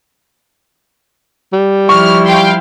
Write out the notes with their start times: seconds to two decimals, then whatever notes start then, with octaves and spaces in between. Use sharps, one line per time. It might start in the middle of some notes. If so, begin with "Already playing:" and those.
1.53 G3
1.89 F3 E4 C#6 F6
2.25 F5 G5 C6